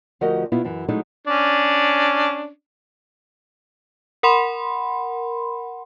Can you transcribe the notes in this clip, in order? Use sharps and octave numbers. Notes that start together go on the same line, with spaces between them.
D2 F3 F#4 G4 A#4 D#5
B2 B3 E4 F4
F#2 E3
F#3 G#3 A3 D#4 E4
C#4 D4
A#4 F#5 B5 C6